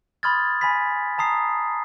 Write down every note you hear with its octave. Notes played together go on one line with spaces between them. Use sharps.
B5 C6 D#6 F6 G#6 A6
G#5 B5 B6
A5 A#5 D#6 C7